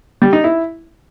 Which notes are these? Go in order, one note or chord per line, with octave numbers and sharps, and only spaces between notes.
G3
D#4
E4